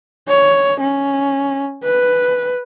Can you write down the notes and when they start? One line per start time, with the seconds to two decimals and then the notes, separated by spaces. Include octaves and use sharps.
0.28 C#5
0.80 C#4
1.84 B4